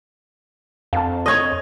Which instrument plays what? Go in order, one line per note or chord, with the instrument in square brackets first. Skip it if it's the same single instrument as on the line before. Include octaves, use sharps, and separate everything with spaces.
[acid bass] F2 [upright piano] F5 A5
[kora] C#5 D#5 [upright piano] D#6 G#6 F7